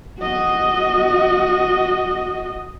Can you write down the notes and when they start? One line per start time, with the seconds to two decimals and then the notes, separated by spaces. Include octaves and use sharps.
0.20 F#4 D#5